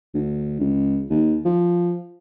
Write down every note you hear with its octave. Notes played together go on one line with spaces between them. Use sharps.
D2
C#2
D#2
F3